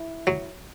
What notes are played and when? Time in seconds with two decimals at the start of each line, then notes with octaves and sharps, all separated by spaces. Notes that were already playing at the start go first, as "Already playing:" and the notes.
Already playing: E4
0.27 F#3